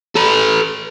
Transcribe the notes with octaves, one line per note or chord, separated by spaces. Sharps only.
A4 B4